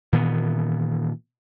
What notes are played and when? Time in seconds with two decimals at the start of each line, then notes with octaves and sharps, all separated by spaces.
0.13 A#2 D#3 E3 B3